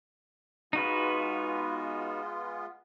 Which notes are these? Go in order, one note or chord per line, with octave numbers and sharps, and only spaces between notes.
G#3 B3 D#4 F4 F#4 B4